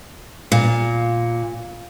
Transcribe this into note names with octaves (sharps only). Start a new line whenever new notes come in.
A#2